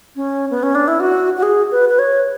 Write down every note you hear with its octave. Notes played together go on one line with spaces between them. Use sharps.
C#4
B3
C#4
D4
E4
F#4
F#4
G#4
B4
B4
C#5